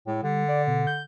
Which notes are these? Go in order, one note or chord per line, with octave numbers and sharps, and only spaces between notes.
A2 G#3
D3 G3
D5
B2
G6